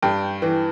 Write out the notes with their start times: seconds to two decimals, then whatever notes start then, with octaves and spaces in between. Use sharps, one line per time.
0.03 G2 G5
0.42 E3